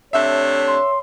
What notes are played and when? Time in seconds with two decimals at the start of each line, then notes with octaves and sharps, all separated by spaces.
0.13 C3 A3 D4 C#5 E5
0.67 C6